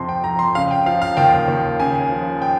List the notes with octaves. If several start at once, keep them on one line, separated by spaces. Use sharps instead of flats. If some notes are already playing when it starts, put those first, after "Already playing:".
Already playing: F2 C3 F3 C6
G5
F2 A#5
C6
C#3 F5
G5
F3 F5
F5
D#2 G5
D#2
C#3 G#5
F3
G5